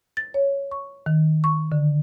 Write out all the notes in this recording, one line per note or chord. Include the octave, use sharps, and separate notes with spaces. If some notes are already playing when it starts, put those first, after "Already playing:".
A6
C#5
C#6
D#3
C#6
D3